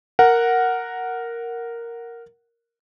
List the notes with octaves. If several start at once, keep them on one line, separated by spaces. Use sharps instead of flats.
A#4 F#5